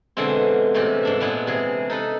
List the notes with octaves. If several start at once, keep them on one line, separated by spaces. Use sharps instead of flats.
B2 D3 E3 G#3 C4
A2 C3 E3 G4
G#2 D4 E5
A#2 G#3 B3 E4
C3 E3 G#4
D#4 A4 B4